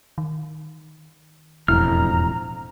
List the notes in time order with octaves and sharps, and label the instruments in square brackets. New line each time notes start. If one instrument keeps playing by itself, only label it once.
[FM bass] D#3
[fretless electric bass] E1 F2 A2 [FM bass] E4 [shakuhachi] A#5 [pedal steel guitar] F6